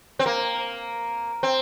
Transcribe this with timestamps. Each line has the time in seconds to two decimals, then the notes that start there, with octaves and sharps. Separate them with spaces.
0.19 C4
0.26 A#3
1.43 C4